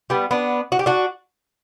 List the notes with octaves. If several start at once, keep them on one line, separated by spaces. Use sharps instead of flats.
G3 B3
B3 D4
F#4
G4
D4 F#4